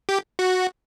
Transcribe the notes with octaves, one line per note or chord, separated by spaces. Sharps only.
G4
F#4